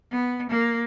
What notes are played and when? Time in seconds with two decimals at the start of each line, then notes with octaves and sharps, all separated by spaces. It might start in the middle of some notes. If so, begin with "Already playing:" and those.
0.11 B3
0.49 A#3